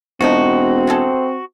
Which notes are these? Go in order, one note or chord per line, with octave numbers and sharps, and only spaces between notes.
E1 C3 F3 C4 D#4 F#4
C3 G#4 A4